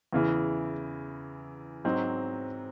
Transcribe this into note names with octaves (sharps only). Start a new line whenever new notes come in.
E2 C#3 E3
G#2 F#3 C4 D#4